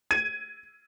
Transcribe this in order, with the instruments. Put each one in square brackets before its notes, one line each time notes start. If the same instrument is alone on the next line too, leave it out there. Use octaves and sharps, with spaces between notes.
[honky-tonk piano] G#6 D#7